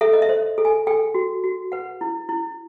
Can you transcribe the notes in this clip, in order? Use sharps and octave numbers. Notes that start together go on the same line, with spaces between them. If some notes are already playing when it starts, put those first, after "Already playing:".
A4 E5
D#5
E5
C5
A4
G#5
A4 G5
F#4
F#4
B4 F#5
E4
E4